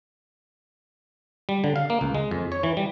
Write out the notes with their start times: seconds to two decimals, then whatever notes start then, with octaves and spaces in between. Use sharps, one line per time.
1.49 G3
1.64 D3
1.76 F5
1.90 A#3
2.01 C#2
2.15 G#3
2.31 F2
2.52 C#5
2.63 E3
2.77 G3